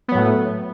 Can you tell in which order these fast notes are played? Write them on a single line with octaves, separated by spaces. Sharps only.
B3 F#3 A2 A3